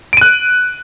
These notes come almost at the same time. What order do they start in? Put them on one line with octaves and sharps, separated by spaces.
D7 D#7 F#6